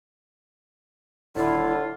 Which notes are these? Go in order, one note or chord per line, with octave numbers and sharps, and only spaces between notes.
D#1 A2 D3 E4 F4